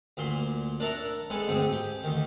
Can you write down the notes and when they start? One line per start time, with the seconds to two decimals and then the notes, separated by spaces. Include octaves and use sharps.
0.17 D2 A#2 C6
0.80 D4 A#4 D5 E5 F#5 A#5
1.30 G#3 B3 G#4 A4
1.48 D2 G#2 C4 G#4 D#6
1.72 G4
2.04 D2 D#3